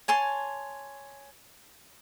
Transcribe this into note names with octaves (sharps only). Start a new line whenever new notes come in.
C#5 G#5 A5 C6